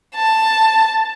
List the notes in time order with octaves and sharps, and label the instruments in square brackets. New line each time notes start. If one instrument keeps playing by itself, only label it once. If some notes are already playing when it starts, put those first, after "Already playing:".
[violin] A5